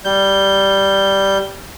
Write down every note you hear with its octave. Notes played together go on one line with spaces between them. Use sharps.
G3 G6